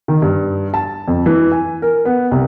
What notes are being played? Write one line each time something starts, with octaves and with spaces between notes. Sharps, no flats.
D#3
G2
A5
F2
E3
G#5
A#4
B3
C2